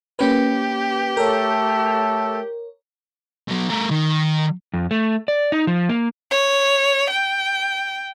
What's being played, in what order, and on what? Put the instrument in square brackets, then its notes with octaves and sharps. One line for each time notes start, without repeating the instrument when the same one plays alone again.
[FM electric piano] A#3 C#4 B4 [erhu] G4
[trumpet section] A3 A4 [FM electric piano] A#4 C#5
[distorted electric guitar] B2 F#3
A3 A#4
D#3
[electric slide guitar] F2
A3
D5
D#4
F3
A#3
[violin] C#5
G5